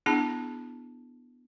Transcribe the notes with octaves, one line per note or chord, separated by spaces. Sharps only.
B3 D4 E4 G#4 A5